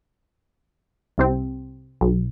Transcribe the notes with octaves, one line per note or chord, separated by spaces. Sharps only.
C2 C3 C4
B1